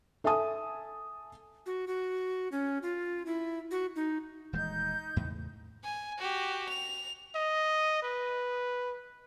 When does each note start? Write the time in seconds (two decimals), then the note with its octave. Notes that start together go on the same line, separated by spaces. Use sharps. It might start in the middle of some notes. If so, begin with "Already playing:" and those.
0.24 A4 E5 G#5 A5 D#6
1.66 F#4
1.87 F#4
2.52 C#4
2.83 F4
3.26 E4
3.71 F#4
3.96 D#4
4.53 D#1 E3 G#3 D#4 G6
5.16 E2 A2 C#3
5.84 G#5
6.18 F#4 G4
6.69 F7
7.35 D#5
8.03 B4